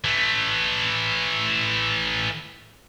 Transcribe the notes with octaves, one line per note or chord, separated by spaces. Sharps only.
E3 A3